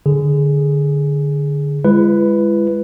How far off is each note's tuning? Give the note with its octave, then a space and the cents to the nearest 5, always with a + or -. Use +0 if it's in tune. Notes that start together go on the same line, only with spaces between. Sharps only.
D3 +0 G#4 +0
G#3 -20 E4 +45 B4 +5